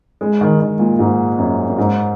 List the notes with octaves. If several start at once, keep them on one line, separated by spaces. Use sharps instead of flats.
G#3
D#3
D#3
A#2
G#2
F#2
F#2
G#2